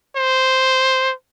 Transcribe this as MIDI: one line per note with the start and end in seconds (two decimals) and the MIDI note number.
0.16 1.13 72